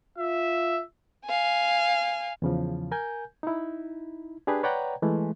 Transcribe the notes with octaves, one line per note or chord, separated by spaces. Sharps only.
F4 E5
F5 G#5
E2 C#3 F3
A#4 G#5 G6
D#4 E4
D4 G4 G#4 B4
B4 C#5 D5 F#5 G5 A#5
E3 G#3 A3